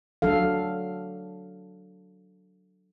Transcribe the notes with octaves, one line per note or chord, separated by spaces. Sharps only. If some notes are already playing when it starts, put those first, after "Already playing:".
F#3 D4 A4 F5